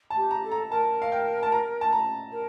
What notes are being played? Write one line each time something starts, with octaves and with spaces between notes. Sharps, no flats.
A5
G4
A#5
A4
A#5
A#4 A5
F5
G5
A5
A#5
A5
A#5
A#4